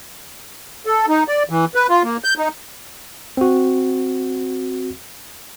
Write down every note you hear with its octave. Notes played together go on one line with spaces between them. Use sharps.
A4
D#4
D5
E3
B4
F4
A#3
G6
D#4
C4 F#4